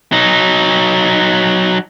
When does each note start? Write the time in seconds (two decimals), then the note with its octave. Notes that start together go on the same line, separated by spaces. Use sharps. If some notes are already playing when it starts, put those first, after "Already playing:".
0.12 F#3 D#4